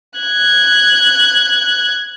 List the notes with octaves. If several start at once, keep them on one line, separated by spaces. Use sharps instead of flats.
F#6 G#6